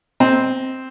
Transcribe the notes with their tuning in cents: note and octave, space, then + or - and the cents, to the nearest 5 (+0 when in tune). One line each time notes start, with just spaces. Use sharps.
C4 +0 D#5 +15